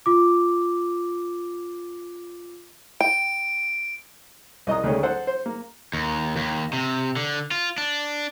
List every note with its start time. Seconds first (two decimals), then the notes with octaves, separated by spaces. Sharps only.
0.06 F4 D6
3.01 G5 D7
4.67 C2 D#5 A#5 D#6
4.83 D2 D#3 G#3 A3 C#4
5.03 A4 C5 F#5
5.27 C5
5.46 A#3
5.94 D#2
6.36 D#2
6.73 C3
7.16 D3
7.51 F4
7.78 D4